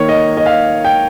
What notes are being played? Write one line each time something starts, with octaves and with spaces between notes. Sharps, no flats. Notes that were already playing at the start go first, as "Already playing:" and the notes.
Already playing: D#3 A#3 C#5
D#5
D#5
F5
G5